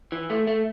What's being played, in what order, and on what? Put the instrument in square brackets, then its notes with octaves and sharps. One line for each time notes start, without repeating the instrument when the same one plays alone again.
[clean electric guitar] E3
A3
A3